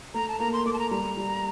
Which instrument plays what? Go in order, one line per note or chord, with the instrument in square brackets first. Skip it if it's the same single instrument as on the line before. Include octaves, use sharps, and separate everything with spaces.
[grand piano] A3 [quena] A#5
[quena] A5
[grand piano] A#3 [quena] A#5
[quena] C6
[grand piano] A3 [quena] D6
[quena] A5
A#5
[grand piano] G3 [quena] A#5
[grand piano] G3